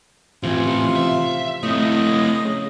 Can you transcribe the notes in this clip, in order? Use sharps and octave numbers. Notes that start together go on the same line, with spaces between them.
A2 C3 E3 F4
E5
A2 A3 C4 D#5
C#3